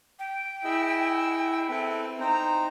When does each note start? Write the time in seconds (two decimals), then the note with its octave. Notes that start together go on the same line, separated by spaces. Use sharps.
0.19 G5
0.64 E4 G#4 D#5 E6
1.71 C4 E4 A4 B4
2.20 D#4 C5 G5 A#5